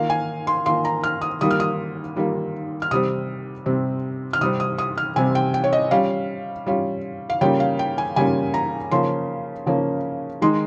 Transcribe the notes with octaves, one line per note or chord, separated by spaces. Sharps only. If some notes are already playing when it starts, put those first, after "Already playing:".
Already playing: D#3 A#3 F4 F5
G#5
C6
D#3 A#3 F4 C6
A#5
F6
D#6
D#3 G3 A#3 F4 D#6
F6
D#6
D#3 G3 A#3 F4
F6
C3 G3 C4 D#6
C3 G3 C4
F6
C3 G3 C4 D#6
D#6
D#6
F6
C3 G3 C4 G#5
G5
G5
C#5
D#5
G3 C#4 F4 F5
G3 C#4 F4
F5
C#3 G3 A#3 C#4 F4 G5
F5
G5
G#5
C#3 G3 A#3 C#4 F4 G#5
A#5
C#3 F3 A#3 C#4 C6
C#3 F3 A#3 C#4
D#3 G#3 D#4 C6